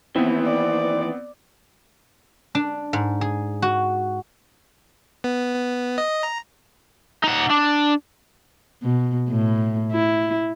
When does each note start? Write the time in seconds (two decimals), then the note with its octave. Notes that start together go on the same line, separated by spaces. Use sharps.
0.16 D#2 E3 B3 C4
0.45 D5
2.55 D4
2.93 G#2
3.21 G#4
3.62 F#4
5.24 B3
5.55 B3
5.98 D#5
6.23 A#5
7.23 D#4 F#5
7.50 D4
8.82 B2
9.30 A2
9.92 E4